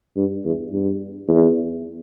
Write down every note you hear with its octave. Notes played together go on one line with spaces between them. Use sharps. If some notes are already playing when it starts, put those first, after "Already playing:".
G2
E2
G2
E2